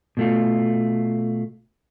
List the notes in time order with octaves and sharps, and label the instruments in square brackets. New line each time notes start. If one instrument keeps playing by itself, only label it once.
[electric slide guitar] B2 A3 F4